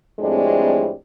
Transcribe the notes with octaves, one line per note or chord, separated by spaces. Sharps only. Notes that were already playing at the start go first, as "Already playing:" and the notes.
F2 A2 G3 G#3 C4 D4